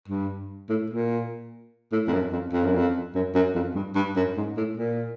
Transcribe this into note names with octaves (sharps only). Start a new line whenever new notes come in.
G2
A2
A#2
A2
F2
F#2
F2
F2
F#2
F2
F#2
F#2
F2
G2
G2
F#2
G#2
A2
A#2